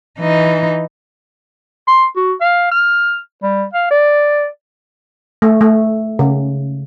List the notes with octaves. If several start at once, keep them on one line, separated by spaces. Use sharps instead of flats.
E3 D#4
C6
F#4
F5
F6
G3
F5
D5
A3
A3
C#3